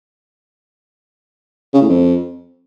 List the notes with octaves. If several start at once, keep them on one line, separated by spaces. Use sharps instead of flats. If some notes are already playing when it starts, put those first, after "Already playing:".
C#3
A2
F2